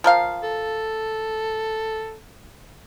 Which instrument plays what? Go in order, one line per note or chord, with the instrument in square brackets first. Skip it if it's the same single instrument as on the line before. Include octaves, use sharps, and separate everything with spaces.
[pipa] F3 A#4 F5
[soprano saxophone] A4